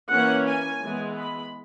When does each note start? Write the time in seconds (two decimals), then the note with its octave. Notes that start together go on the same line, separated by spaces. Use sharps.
0.10 E3 A#3 C#4 F#5
0.46 G#5
0.81 E3 G#3 B3
1.16 B5